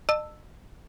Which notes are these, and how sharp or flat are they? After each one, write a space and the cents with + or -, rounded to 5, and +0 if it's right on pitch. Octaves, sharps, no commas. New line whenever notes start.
D#5 -40 A5 +25 E6 +0